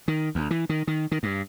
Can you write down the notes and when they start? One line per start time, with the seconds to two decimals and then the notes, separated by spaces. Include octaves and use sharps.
0.08 D#3
0.35 D2
0.51 E3
0.69 D#3
0.87 D#3
1.12 D#3
1.23 G2